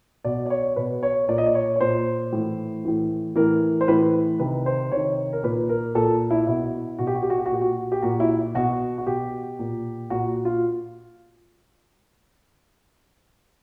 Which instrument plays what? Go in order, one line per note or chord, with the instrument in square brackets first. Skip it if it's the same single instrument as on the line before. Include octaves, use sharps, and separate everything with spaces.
[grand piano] B2 D5
D5
C#5
B2 B4
C#5
A#2 D5
D#5
D5
C#5
C#5
A#2 C5
A2 E3
A2 E3
A2 E3 A#4
C5
A2 E3 B4
C3 D#3 B4
C5
C3 D#3 C#5
A#4
A#2 B4
A#4
A#2 A4
E4
B2 E4
B2 F#4
G4
F#4
G4
F#4
G4
F#4
A#2 G4
F#4
G4
A#2 F#4
E4
B2 F#4
F#4
B2 G4
A#2
A#2 F#4
F4